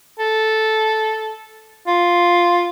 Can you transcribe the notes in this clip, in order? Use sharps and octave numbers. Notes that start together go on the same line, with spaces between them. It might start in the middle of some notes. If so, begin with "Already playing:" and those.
A4
F4